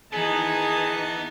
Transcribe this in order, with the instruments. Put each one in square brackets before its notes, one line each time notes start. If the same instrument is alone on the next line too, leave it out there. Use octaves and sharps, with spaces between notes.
[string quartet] D#3 E3 D#4 [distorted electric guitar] B3 [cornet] G#4 [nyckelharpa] A5